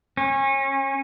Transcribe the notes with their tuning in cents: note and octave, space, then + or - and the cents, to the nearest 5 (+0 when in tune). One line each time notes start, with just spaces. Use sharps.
C#4 -30